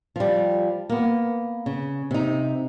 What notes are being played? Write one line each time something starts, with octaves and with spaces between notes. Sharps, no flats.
F3 G3
A#3 B3
C#3
C3 D#4